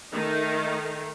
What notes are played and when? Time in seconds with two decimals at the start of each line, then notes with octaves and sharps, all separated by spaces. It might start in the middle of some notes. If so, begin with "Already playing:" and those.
0.12 D#3 A3 D#4